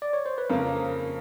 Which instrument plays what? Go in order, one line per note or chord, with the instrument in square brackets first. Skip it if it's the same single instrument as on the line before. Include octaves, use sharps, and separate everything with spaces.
[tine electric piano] D5
C#5
C5
B4
[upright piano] F2 C#3 F3 A#3 [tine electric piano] A#4